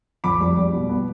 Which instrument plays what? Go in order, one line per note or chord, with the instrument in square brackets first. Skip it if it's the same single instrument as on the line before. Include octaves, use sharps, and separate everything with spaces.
[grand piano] F2 B5 D6
G3
G3
B2
B3